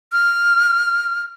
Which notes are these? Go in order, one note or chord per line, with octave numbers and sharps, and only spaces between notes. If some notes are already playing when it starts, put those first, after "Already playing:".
F6